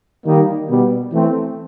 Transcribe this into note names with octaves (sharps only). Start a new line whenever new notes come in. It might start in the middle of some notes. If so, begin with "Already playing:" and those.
D#3 G3 A#3 D#4
B2 G3 B3
E3 A3 C4